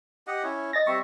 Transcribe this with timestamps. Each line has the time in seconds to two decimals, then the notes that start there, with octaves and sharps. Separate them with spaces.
0.27 G4 D#5 F#5
0.43 C#4 E4 C#5
0.73 D#5 A6 A#6
0.87 G3 C4 E5 C#6